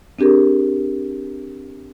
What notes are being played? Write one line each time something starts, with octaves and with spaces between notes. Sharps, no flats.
C4 D4 G4 G#4 A#4